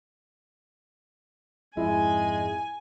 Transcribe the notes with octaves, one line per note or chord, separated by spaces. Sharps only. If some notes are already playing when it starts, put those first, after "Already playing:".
F2 G#2 G#3 E4 G#5